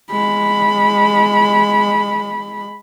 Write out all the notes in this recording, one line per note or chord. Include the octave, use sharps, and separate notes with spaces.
G#3 B5